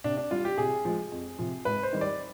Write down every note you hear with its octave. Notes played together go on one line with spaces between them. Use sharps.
C3 D4
D4
G3 F4
G4
C3 G#4
F3 G#3
F2
C3 F3
G#2 B4
C5
D#3 G3
D5